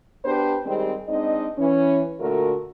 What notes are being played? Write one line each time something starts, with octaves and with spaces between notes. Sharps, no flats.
B3 D4 G4 B4 C5
D#3 G3 G#3 C4
G#3 C4 D4 D#4 D#5
E3 C#4
A#2 D3 A3 F#4 A#4